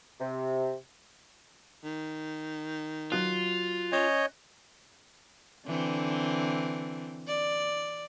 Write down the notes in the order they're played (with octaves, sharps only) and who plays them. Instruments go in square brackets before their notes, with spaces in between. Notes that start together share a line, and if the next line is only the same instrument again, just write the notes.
[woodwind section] C3
[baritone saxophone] D#3
[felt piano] F#3 F#6 [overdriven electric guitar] F4
[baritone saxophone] C#4 [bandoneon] C#5 D#5 G6
[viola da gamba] D3 E3 C4
D5